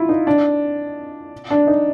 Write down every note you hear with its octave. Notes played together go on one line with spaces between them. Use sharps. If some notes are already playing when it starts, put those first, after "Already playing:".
Already playing: E4 F4
D#4
D4
D4
D#4